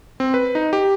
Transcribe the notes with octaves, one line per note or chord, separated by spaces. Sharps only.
C4
B4
D#4
G4